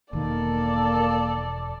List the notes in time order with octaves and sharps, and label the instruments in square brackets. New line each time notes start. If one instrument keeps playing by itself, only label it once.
[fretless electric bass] E1 D#3 [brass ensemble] A#3 [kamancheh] A4 D5